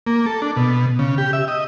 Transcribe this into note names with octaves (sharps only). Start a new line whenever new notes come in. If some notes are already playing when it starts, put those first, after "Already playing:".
A#3
A4
D4
B2
C#3
G4
E5
D#5